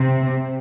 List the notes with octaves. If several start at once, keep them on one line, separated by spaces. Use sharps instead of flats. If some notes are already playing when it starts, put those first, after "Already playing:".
Already playing: C3 C4